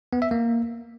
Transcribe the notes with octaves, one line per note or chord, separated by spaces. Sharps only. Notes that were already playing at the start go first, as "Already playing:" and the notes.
B3
E5
A#3